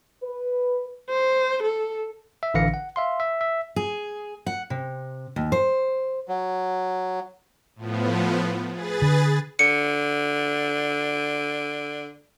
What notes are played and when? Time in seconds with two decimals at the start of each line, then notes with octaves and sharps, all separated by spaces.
0.23 B4
1.10 C5
1.63 A4
2.43 E5
2.54 A1 D3 E3 F5 A#6 C#7
2.74 F#5
2.96 E5 F5 C6
3.20 E5
3.41 E5
3.76 G#4
4.46 F#5
4.70 C3
5.36 D#2
5.52 C5
6.28 F#3
7.76 A2 F3 B3
8.71 G#4 B4 A6
9.02 D3
9.59 D3 C#7